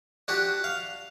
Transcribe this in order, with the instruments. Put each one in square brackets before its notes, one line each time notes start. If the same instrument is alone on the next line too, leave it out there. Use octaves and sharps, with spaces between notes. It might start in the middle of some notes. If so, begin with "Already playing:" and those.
[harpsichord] D4 F#4 G4
F5